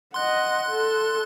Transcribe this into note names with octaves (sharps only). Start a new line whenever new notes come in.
D#5 F#5 C6 F#6
A4